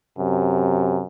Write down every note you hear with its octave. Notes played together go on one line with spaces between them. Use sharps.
F#2 C3